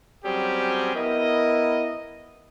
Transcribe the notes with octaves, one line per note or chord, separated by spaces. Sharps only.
F#3 G3 C4 C#4 G4 G#4
B3 E4 A#4 D#5